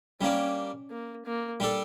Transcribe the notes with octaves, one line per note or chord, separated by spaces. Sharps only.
G3 A#3 C#4 D4
A#3
A#3
G3 D4 A4